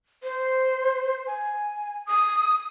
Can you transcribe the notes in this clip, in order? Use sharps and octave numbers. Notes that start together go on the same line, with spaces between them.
C5
G#5
D#6